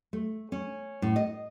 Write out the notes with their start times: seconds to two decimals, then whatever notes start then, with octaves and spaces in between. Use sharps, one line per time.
0.13 A3
0.52 C#4
1.02 A2
1.16 D#5